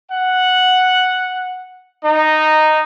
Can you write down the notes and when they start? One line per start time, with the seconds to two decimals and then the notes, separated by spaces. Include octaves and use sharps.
0.12 F#5
2.05 D#4